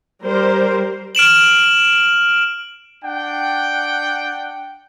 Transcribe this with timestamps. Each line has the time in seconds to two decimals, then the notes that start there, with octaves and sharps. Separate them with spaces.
0.22 G3 A#4 C5
1.15 F6 D7 E7 F#7
3.04 D4 F#5 G5